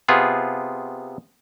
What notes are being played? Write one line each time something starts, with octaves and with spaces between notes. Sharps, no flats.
C3 B3 F4 G#4